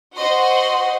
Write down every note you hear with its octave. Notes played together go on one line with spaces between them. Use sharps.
F#4 C5 D#5 F#5 C6